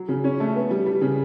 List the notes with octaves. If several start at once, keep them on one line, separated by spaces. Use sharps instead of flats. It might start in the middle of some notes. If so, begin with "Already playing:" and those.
Already playing: F#3
C#3
C#4
A3
B3
G3
G3
C#3